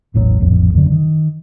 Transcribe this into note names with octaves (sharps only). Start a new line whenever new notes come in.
E1 A1 G#2 F#3
D#1 A1 F2
F#1 F#2 D3
D#3